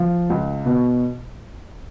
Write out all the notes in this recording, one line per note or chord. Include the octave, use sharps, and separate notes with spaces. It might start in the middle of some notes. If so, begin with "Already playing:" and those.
Already playing: F3
C#2
B2